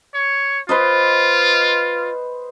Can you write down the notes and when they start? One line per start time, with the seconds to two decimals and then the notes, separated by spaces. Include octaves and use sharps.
0.15 C#5
0.69 F4 B4 C5 D#5